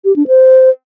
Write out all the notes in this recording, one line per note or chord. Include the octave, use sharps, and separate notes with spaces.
G4
D4
C5